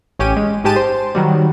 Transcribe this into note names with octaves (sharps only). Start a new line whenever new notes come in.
A1 C#4 G4 D#7
G#3
G#2 G#3 G4 A5 D#7
C5
D#3 F#3 G3